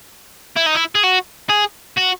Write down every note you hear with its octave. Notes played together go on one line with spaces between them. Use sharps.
E4
D#4
E4
G#4
F#4
G#4
F#4